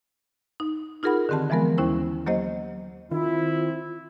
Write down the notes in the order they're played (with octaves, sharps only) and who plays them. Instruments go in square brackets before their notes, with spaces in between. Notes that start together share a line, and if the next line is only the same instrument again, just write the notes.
[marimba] D#4
D#4 F4 G#4 A#4 F#5 B5
D3 D#3 C4 G4 A5
E3 F3 G#3 B3 A#4
D#2 C#4 E4 C5
F#3 A#3 G4 C5 D#5
[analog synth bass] D#3 [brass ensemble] C4 E4 [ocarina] F4